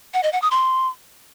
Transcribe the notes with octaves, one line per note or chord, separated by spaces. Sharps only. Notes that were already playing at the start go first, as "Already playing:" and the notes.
F#5
D#5
F#5
D#6
C6